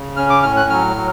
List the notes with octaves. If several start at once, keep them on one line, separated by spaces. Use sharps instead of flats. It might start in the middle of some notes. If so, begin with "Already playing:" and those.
Already playing: C#3
C#4 F6
D6
A2 F6
F#6
F#3 F6
F#3